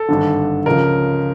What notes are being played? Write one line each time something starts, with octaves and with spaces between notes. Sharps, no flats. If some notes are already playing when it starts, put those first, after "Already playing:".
Already playing: A4
G#1 G2 D3
C#2 C#3 F3 A#4